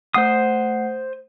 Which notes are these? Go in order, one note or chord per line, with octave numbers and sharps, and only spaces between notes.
A3 C5 F#5 D#6 C7